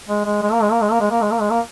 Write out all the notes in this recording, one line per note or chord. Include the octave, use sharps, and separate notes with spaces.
G#3
G#3
G#3
A#3
G#3
A#3
G#3
A#3
G#3
A#3
G#3
A#3
G#3
A#3